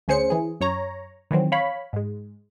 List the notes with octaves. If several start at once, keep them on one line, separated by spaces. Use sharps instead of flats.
D2 C#4 G#4 C5 C#7
E3 G#4
F#2 C#5 A#5
D#3 E3 F#3 C4
C#5 F5 B5
G#2 G#3